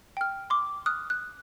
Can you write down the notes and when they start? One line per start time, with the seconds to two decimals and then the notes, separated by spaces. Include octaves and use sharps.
0.17 G5 F6
0.50 C6 D6
0.86 D#6 F6 F#6
1.10 F#6